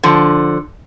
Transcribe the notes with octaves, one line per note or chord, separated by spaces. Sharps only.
D3 F3